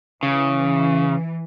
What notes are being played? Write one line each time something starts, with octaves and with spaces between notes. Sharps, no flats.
C#3 E3